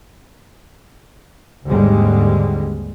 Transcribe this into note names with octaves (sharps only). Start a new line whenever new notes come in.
G#1 D#2 G#2 D3 G3 G#3